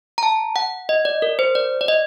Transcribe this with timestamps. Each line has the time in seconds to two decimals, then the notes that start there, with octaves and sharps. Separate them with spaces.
0.18 A#5
0.23 A5
0.56 F#5
0.89 D#5
1.05 D5
1.22 A#4
1.39 C5
1.55 D5
1.81 D5
1.88 D#5